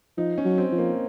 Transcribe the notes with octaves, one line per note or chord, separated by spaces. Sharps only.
F3 D#4
C#4
F#3
C4
F3
A#3